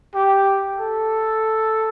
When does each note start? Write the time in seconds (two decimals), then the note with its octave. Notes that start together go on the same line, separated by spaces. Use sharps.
0.15 G4
0.76 A4